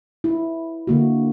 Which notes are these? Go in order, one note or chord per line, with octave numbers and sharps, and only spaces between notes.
E4
D3 A#3 F#4